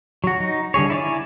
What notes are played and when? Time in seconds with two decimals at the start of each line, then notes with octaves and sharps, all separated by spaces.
0.24 F#3 F#4
0.40 D#4
0.74 D3 G3 G#4 C#5
0.90 E4 D5 G#5